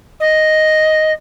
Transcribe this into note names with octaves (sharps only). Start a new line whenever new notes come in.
D#5